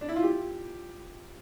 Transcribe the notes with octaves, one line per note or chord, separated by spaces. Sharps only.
D4
E4
F4
G4